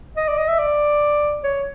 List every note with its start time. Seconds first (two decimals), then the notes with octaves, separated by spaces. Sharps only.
0.17 D#5
0.28 D5
0.38 D#5
0.48 E5
0.59 D5
1.44 C#5